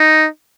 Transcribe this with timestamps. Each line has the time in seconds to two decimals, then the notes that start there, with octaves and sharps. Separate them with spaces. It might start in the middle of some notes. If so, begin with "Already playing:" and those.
Already playing: D#4